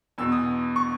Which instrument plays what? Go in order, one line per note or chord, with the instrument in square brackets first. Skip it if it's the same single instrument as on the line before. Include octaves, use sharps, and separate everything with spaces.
[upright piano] E2 B2 E6
D#6
C#6